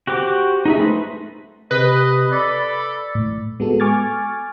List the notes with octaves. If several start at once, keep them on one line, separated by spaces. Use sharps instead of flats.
F#4 G4 C5 D6
D#4 G#4 E5
A3 B4 C5
C3 B4 D#5
A4 D5 B5
A2
G#3 B3 F#4 A4
G#5 C#6 D6 F6 G#6 A6